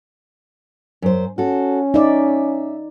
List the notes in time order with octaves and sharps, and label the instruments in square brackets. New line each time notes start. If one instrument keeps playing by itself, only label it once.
[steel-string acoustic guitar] F#2 C5
[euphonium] C#4 [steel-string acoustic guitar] F#4 A4
[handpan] D#4 D5 [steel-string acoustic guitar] E5